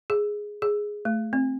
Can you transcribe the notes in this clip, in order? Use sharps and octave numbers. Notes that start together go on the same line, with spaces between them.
G#4
G#4
A3
C4